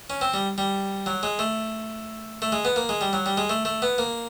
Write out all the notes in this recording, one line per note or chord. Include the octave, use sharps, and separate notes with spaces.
C#4
C4
G3
G3
F#3
G#3
A3
A3
G#3
B3
A#3
G#3
G3
F#3
G3
G#3
A3
A3
B3
A#3